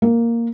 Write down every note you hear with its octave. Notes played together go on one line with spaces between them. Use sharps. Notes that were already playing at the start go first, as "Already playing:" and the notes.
A#3